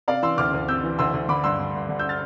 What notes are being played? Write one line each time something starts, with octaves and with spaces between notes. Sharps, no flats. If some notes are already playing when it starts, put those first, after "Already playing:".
C3 D5 F5
E3 C6 E6
D2 D6 F6
D2
C3 E6 G6
E3
D2 C6 E6
D2
D3 B5 D6
G2 C6 E6
D3
G2
D3
E6 G6
F6 A6